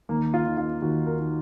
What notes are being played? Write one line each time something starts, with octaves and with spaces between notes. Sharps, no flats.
D#2 A#3
F4
D#3
F4
D#2 F#4
A#4
D#3